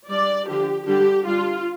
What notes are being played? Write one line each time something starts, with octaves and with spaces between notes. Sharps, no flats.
G3 D4 D5
D3 F3 D4 G4
D3 G3 D4 G4
G3 D4 F4